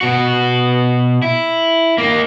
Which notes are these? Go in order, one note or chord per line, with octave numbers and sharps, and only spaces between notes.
B2 F#4
E4
A#3 D#4